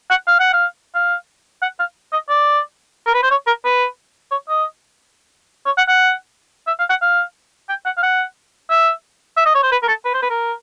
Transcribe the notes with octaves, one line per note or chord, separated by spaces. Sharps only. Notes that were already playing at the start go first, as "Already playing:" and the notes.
F#5
F5
F#5
F5
F5
F#5
F5
D#5
D5
A#4
B4
C5
C#5
A#4
B4
C#5
D#5
C#5
F#5
F#5
E5
F5
F#5
F5
G5
F#5
F5
F#5
E5
E5
D#5
C#5
C5
B4
A#4
A4
B4
C5
B4
A#4